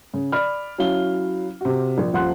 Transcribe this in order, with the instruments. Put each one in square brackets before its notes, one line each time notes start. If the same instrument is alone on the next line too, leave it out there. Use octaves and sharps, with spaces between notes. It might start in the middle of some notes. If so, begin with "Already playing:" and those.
[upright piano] C#3
D5 B5 F6
F#3 C#4 E4 F5 G7
C3 F#4
A#1
D#1 F3 F#5 C6 F#6